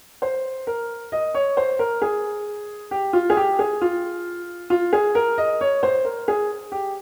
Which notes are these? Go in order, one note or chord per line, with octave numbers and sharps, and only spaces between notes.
C5
A#4
D#5
C#5
C5
A#4
G#4
G4
F4
G#4
G4
G#4
F4
F4
G#4
A#4
D#5
C#5
C5
A#4
G#4
G4